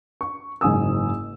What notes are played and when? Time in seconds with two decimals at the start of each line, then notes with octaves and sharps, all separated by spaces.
0.21 C#6
0.61 F#1 G#2 G#5 D#6 E6